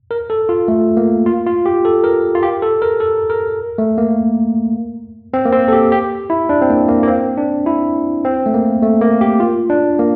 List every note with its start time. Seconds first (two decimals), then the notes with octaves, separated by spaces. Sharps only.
0.11 A#4
0.30 A4
0.49 F4
0.68 A3
0.97 A#3
1.26 F4
1.46 F4
1.66 G4
1.85 A4
2.04 A#4
2.35 F4
2.43 G4
2.62 A4
2.82 A#4
3.00 A4
3.30 A#4
3.78 A3
3.98 A#3
5.34 C4
5.45 A#3
5.53 C4
5.68 A4
5.73 G4
5.92 G4
6.30 E4
6.49 D4
6.61 C4
6.70 A#3
6.88 A#3
7.03 A#3
7.08 C4
7.37 D4
7.66 E4
8.25 C4
8.46 A3
8.54 A#3
8.82 A3
9.01 A#3
9.21 G4
9.40 F4
9.70 D4
9.99 A#3